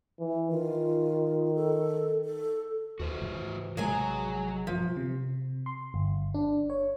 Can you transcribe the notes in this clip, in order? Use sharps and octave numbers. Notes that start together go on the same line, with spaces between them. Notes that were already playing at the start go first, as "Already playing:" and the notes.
E3
D#3 F4
A4
A4
D#2 F#4 B4 C5
G#2 C#3 E3
A1 C3 F#3 G#3 G#4 G#5 A#5
G2 B2 F3
C3
C6
G1
D4
C#5